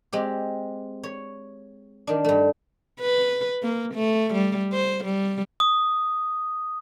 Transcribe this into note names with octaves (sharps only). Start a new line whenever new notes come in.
G#3 C4 G4
C#5
D#3 D4
G2 A3
B4
A#3
A3
G3
C5
G3
D#6